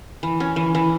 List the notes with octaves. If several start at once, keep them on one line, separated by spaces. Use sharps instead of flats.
E3
C#4
E3
E3